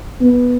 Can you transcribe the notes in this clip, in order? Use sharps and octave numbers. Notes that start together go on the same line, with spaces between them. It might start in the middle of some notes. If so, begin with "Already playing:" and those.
B3